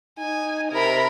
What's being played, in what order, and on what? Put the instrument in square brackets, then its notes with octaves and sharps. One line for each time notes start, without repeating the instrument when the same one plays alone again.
[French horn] D#4 [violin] G#5
[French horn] C3 [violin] A#4 B5